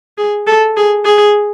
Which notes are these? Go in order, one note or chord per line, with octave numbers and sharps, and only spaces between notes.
G#4
A4
G#4
G#4